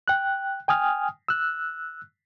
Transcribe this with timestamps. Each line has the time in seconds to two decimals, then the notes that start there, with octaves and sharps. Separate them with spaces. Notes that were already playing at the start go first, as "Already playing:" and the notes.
0.08 G5 F#6
0.68 G5 G#5 D#6 F6
1.28 E6 F#6